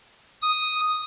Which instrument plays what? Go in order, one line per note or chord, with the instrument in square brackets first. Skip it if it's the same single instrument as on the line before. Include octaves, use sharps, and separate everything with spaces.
[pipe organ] D#6